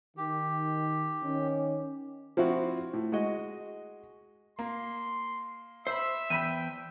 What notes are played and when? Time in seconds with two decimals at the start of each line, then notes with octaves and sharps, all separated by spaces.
0.17 D#3 G4
1.23 D#3 C#4
2.37 F3 C4 E4 F#4
2.93 A2
3.12 G#3 F#4 D#5
4.59 A#3 C6
5.87 C5 E5 B5 E6
6.30 E2 G5 B5 B6 D#7